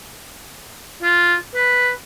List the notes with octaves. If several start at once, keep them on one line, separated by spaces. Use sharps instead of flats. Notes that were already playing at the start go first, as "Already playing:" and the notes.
F4
B4